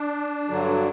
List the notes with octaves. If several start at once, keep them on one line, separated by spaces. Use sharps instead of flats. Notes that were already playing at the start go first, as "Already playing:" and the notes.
Already playing: D4
G2 D3 F#3